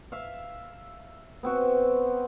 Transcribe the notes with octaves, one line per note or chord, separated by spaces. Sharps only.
E5 F5
B3 C4 F#4